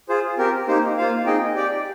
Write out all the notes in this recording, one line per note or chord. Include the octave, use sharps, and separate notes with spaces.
F4 G#4 C5
C4 G4 A#4
A#3 D#4 G4 C5
A#3 F4 C5 F5
C4 D#4 G#4 D#5 G5
G4 D5 G5